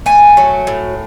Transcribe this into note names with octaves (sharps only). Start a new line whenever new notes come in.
A3 G#5
F#3
A2